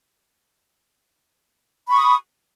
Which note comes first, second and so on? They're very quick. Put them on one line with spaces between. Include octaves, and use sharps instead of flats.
B5 C#6 D#6